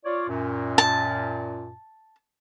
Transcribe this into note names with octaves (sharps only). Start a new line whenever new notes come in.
F4 C#5 D5
F#2 A#2
A5